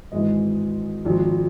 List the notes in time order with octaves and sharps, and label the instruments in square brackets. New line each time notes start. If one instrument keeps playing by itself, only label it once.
[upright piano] G#1 G#2 E3 G#3 D#5
G#1 G#2 F3